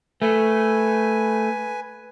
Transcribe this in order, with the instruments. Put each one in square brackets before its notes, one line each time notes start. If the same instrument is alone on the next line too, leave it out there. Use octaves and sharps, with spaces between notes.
[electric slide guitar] A3 [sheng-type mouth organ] B4 G#5